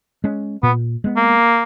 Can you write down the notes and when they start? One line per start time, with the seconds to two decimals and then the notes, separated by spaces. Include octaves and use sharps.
0.24 G#3 C#4
0.63 A#2 B3
1.04 G#3 B3
1.17 A#3